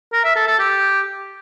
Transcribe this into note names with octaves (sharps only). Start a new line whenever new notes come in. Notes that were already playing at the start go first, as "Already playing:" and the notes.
A#4
E5
A4
A4
G4